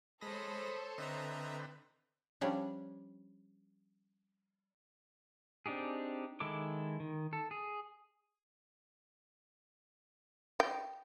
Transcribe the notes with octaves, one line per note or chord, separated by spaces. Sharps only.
G#3 A4 C5 C#5 B5 D#6 A#6
D3 C4 B4 D#5 E5 A#5
F3 G3 C#4 D4
C4 D4 D#4 G4 G#4
D#3 G#3 E4 A4 D6
D#3
A4
G#4
G5